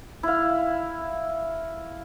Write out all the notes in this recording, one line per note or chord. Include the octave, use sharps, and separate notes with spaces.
E4 F5